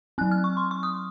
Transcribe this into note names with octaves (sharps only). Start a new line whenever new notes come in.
F#3 C4 F#6
F6
C#6
C6
C#6
D#6